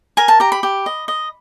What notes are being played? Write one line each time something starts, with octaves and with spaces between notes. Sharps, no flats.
A#4 G#5
A5
G4 A#5
B5
G4
D#5
D#5